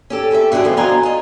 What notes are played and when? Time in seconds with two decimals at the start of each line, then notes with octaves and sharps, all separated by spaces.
0.10 C#4 G4 A4
0.31 G4 A4 C5 E5
0.52 B2 D3 B3 G4 G#4
0.64 D2 D3 F3 B3 C4
0.77 B2 D4 F4 D#5 G#5 A#5
1.03 F4 D#5